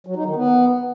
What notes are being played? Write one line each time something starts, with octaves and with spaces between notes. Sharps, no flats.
F#3
D#4
D#3
B3